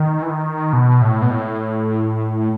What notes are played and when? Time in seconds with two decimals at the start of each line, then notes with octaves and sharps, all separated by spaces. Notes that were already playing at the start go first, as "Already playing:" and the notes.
Already playing: D#3
0.22 E3
0.30 D#3
0.73 B2
1.02 A2
1.22 B2
1.31 A2